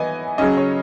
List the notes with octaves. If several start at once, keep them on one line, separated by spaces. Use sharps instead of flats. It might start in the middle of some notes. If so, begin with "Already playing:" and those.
Already playing: E3 B3 D#5 G#5
C#3 F#3 C#4 D#5
C#5